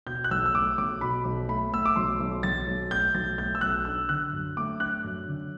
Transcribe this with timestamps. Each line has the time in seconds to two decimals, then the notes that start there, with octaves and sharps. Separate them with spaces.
0.06 B2 G6
0.24 F#6
0.31 B1 E6
0.46 E6
0.54 A3 D6
0.78 B1 D6
1.01 B2 B5
1.25 B1
1.48 A3 B5
1.72 A3 E6
1.85 D6
1.96 B1 C6
2.20 B1
2.43 B1 A6
2.67 B1
2.91 A3 G6
3.15 B1 A6
3.38 A3 G6
3.55 E6
3.61 B1 F#6
3.85 D4 E6
4.09 D3 F#6
4.33 F#2
4.57 A3 D6
4.80 D4 F#6
5.04 F#2
5.28 D3